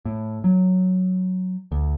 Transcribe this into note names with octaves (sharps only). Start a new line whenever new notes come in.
A2
F#3
D2